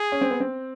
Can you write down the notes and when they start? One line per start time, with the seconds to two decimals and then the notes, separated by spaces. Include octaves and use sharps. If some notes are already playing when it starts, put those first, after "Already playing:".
Already playing: G#4
0.12 C#4
0.21 C4
0.31 B3
0.40 C4